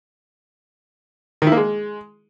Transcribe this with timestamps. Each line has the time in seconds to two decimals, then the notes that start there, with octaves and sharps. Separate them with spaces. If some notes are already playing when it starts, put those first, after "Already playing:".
1.42 D#3
1.47 E4
1.52 A#3
1.57 G#3